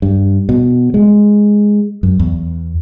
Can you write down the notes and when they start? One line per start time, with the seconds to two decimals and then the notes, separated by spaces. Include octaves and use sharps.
0.02 G2
0.49 B2
0.94 G#3
2.03 F#2
2.20 E2